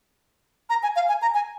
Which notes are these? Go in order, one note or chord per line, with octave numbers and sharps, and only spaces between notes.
A#5
G#5
F5
G#5
A#5
G#5